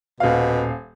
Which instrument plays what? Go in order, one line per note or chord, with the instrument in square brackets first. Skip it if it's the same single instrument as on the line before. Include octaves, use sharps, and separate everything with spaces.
[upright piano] D#1 F5 [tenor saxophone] B2